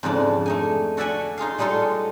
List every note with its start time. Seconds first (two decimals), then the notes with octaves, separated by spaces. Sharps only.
0.03 F2 G#2 C#3 D4
0.46 A3 D#4 G#5
0.97 F#4 A4 D5 E5 F#5 G#5
1.38 D#4 F4 G#4 F5
1.58 G3 G#3 D#4 F4 A4 C#5